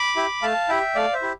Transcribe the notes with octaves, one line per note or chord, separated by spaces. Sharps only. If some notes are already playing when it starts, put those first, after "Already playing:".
Already playing: B5 D6
E4 G4
A3 F5 A5
E4 G4 E5 G5
A3 D5 F5
C5 E5
E4 G4